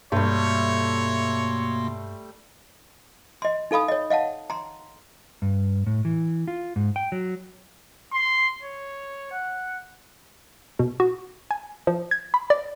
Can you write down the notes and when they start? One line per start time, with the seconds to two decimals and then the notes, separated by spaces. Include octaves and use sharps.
0.12 G2 B2 G3 A3 A#3 C#5 C6
3.42 D#5 C6
3.71 D#4 A4 F5 B5 D#6
3.88 C#5 D#5
4.10 D#5 F5 F#5 A5
4.50 A#5 C6
5.42 G2
5.87 A2
6.05 E3
6.48 F4
6.76 G#2
6.96 G5
7.12 F#3
8.13 C6
8.63 C#5
9.32 F#5
10.79 B2
11.00 F#4
11.51 G#5
11.87 F3
12.11 G#6
12.34 B5
12.50 D5